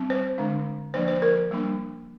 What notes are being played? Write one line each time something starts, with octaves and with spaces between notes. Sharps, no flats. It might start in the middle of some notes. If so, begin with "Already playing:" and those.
Already playing: G3 C4
C5
D3 G#3 D4
F3 A#3 D4 C5
C5
A#4
G3 A#3 D4